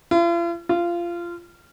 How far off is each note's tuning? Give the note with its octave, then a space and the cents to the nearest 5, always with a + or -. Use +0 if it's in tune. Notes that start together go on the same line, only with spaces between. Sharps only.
F4 -45
F4 -20